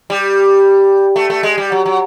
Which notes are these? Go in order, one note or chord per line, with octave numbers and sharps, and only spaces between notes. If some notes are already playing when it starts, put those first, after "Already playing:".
G3
A3
A3
G#3
G3
F#3
F#3